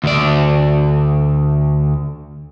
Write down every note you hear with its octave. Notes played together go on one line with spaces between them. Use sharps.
D2 D5